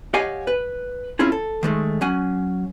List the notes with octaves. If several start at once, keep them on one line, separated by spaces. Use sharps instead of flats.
G4 C#5 D#5 F5 F#5 G#5
B4
C4 C#4 E4 F4 G#4
A4
D#3 G#3 A3
F#3 C#4 F#5 G#5